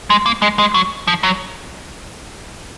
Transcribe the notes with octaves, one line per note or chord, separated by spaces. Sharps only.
G#3
A#3
G#3
G#3
F#3
F3
F#3